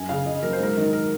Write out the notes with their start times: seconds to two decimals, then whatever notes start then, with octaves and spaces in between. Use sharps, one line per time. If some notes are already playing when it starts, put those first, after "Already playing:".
Already playing: F#2 G#5
0.09 C#3 F5
0.26 C#3 D#5
0.42 F#3 A#4
0.53 C5
0.59 G#2 A#4
0.77 D#3
0.93 A#4